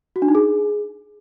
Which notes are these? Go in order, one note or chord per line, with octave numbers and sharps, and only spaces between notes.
F#4
D4
D#4
G#4